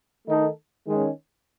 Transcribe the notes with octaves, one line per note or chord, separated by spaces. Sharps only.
D#3 A3 D#4 A4
D#3 G#3 C#4